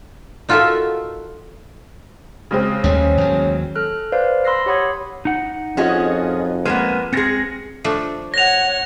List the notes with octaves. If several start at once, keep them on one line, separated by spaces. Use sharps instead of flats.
D#4 F4 F#4 A4 A#4 E5
C#3 G#3 C4
D#2 G3 A3 C#4
D#2 F#3
A4 F6 F#6
B4 C5 D5 F5
B5 C6 E6 F#6 A#6 C7
G4 C#5 F#5 B5 D#6 G#6
D#4 F#5
F2 C#4 F4 F#4 G#4 D#5
G#3 A#3 B3 B4 F6 D#7 E7
G#3 C4 G#4 A#6 C#7
F3 A3 D4
C#5 F#5 A#6 F7